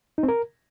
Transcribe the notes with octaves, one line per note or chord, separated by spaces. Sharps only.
D#4
C4
A#4